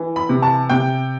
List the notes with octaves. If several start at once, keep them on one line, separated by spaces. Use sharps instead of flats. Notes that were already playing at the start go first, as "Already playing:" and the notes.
Already playing: E3
B5
C3
A5
C3 G5